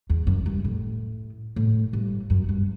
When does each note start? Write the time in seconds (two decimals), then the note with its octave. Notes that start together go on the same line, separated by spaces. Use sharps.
0.10 E2
0.27 F#2
0.46 G2
0.64 A2
1.56 A2
1.93 G2
2.30 F#2
2.49 G2